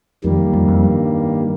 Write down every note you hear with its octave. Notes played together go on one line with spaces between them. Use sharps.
F2 D#3 G3 A#3
F2
F2
G2